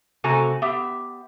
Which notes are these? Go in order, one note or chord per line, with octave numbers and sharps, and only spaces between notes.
C3 A3 F#4 G#5 A#5
B3 G4 E5